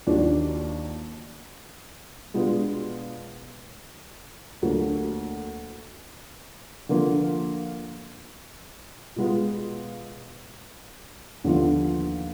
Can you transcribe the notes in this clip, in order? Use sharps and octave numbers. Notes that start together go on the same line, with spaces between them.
D#2 D#3 F#3 D4 F4
B2 G#3 B3 D4 F4
D2 D3 F#3 A#3
D3 F3 A#3 F4
B2 G#3 B3 F4
D#2 D3 F3 B3 F4